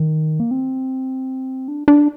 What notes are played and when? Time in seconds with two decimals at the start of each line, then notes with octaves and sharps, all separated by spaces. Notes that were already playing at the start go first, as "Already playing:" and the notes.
Already playing: D#3
0.40 A#3
0.51 C4
1.68 D4
1.88 D4